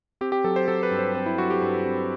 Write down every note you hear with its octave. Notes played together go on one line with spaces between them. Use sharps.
C4 G4
G4
F#3 A4
C5
F#3 A4
B4
G2
C5
C4 B4
E4
F#3 F#4
G4
G2 B4
C4